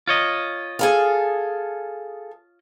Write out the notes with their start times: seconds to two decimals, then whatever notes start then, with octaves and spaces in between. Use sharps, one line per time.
0.07 F4 C#5 D#5
0.79 G#4 A4 F5